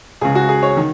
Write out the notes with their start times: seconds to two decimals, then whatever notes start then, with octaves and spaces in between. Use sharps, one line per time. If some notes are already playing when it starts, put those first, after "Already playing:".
0.21 C#2 C#3 G#4
0.35 F#4
0.49 G#4
0.63 C#5
0.77 D#3